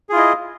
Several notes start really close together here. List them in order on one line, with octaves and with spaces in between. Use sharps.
G#4 F4 E4 D#5